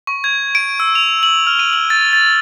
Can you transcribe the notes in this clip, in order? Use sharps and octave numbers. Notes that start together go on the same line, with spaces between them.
C#6
G#6
D7
E6
F7
F#7
F6
D#7
F#7
A6
A6